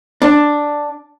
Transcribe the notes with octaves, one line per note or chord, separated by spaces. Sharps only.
D4